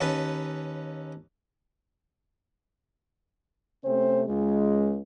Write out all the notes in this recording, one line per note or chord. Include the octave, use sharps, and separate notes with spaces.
D#2 C#4 B4 A5
C3 A3 C4 C#4 C5
C#2 G#3